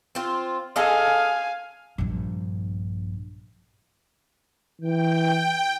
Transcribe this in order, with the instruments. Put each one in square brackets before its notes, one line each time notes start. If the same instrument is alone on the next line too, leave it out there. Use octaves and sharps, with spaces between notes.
[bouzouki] C4 F4
[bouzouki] G#4 A4 D#5 [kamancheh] F5 G#5
[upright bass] A#1 G2
[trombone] E3 [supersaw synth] G5